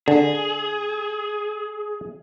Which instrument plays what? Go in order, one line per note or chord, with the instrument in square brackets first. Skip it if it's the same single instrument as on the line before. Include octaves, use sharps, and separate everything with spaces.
[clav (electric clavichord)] D3 [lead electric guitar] G#4